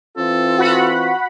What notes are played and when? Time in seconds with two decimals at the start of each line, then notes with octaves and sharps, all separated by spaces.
0.17 E3 C4 F4 A4
0.58 F#4 F#5 B5